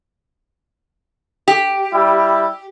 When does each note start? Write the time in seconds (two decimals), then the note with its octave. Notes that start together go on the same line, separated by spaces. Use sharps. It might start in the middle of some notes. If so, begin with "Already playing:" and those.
1.48 G4
1.94 G3 E4